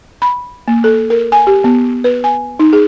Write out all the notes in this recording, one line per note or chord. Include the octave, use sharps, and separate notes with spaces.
B5
A#3
A4
A#4
G#5
G4
B3
B4
G#5
D#4
G#4